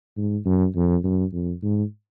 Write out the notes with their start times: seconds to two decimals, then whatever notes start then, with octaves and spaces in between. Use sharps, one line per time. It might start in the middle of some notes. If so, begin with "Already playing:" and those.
0.17 G#2
0.46 F#2
0.76 F2
1.04 F#2
1.33 F2
1.63 G#2